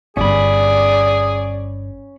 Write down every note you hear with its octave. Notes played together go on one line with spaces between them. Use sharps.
G1 G2 C#4 G#4 D5 B5